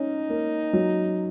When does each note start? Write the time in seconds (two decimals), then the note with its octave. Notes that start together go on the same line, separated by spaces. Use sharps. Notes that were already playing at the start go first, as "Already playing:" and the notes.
Already playing: C#4 D#4
0.30 A#3
0.73 F#3